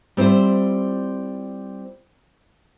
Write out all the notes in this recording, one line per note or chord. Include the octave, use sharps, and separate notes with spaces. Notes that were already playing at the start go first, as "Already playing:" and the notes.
G3 C4 E4 F4 C5